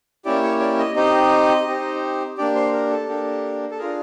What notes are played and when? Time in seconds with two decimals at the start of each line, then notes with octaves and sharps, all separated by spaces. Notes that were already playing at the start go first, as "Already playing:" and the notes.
0.25 A#3 C#4 E4 G4 D5
0.43 C#5
0.60 D5
0.79 D#5
0.96 C4 D#4 G4 D#5
1.67 C4 D#4 G4
2.37 A#3 D4 G4 D5
2.55 C5
2.73 A#4
2.90 A4
3.08 A#3 D4 G4
3.71 A4
3.79 D4 F4 G#4 A#4